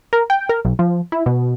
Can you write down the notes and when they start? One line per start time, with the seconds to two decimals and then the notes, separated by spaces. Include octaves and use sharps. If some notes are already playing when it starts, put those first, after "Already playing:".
0.13 A#4
0.30 G5
0.49 A#4
0.65 B1
0.79 F3
1.12 E4
1.26 B2